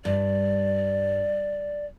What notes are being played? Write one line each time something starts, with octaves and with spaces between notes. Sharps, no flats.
G2 D5